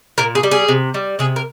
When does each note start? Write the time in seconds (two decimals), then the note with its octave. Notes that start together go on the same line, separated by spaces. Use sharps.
0.18 A#2 A#4
0.35 G#4
0.43 G3
0.51 G#4
0.68 C3
0.94 G3
1.19 C3 G#4
1.36 A#4